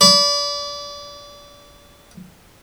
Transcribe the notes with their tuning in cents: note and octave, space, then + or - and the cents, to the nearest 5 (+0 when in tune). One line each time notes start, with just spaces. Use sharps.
D5 -30 B5 +0